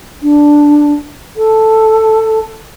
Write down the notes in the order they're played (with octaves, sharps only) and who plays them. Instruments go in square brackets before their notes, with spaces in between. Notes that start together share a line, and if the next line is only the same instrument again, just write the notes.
[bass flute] D4
A4